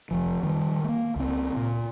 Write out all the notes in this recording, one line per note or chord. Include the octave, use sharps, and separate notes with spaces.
F1 F3
D#3 G3
A3 A#3
C#2 C4
A#2